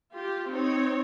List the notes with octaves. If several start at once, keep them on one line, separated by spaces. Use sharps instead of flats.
F4 G4
C4 D#4 C#5